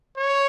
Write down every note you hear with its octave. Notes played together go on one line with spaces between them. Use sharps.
C#5